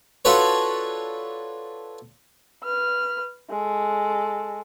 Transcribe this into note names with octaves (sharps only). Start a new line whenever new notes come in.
D4 F4 F#4 A4 B4 C#5
B4 F6
G#3 A4